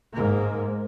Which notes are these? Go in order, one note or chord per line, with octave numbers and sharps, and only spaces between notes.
G#2 A#3